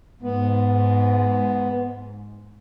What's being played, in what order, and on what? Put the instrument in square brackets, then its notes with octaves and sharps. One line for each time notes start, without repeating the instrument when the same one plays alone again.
[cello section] G#2 [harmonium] B3